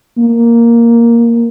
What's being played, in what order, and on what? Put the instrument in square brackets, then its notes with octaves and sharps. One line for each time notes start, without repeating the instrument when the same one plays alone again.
[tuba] A#3